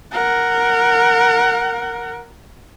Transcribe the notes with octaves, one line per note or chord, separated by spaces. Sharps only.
A#4 F#5